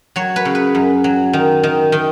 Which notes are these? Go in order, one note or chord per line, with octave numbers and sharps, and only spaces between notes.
F#3 C#5
B4
C#3
B4
F#2
F#3
D#3
D#3
D#3